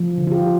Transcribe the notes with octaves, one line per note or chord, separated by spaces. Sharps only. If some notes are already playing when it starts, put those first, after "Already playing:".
Already playing: F3
D3
F4
G4